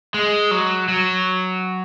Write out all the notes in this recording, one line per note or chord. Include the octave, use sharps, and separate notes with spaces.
G#3
F#3
F#3